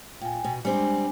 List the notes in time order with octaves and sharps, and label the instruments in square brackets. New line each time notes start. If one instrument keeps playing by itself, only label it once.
[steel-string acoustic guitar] A#2 [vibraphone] G5 G#5
[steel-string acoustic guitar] B2
[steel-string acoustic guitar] G3 C4 [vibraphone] G#3 D4 G#5